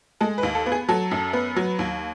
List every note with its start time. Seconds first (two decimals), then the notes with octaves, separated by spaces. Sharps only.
0.20 G#3 A4
0.38 B4
0.43 D#2
0.55 A4
0.66 B3
0.72 G#4
0.89 F#3 A4
1.11 F#2
1.33 B3
1.56 F#3
1.79 D#2